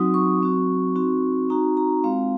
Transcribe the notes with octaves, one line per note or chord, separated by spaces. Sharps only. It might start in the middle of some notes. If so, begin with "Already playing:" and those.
Already playing: F#3 C4 D#4 F#4 D#6
C#6
F#3 C4 F#4
C4 D#4 F#4
C4 D#4 F#4 A#5
A#5
G#3 C4 F4 F5